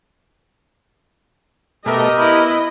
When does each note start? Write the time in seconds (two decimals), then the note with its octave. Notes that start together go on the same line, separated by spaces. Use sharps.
1.86 B2 A3 G4 A#4 D#5 E5
2.16 B3 E4